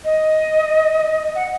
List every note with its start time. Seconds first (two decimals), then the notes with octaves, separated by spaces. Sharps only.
0.05 D#5
1.35 F#5